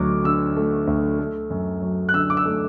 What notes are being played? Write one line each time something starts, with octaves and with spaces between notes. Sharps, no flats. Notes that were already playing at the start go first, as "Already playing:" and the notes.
Already playing: D2 F#3 A3 D6
D3 E6
A3
D2
A3
F#2
F#3
F#6
D3 E6
D6
E6
A3